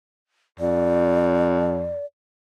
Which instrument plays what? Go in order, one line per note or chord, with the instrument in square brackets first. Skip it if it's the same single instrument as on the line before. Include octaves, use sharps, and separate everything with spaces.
[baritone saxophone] F2 [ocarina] D5